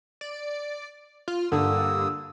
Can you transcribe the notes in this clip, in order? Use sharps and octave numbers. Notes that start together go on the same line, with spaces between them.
D5
F4
G2 D3 A#3 D#6 E6